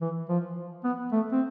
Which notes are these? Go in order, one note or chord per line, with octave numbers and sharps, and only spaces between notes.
E3
F3
B3
A3
C4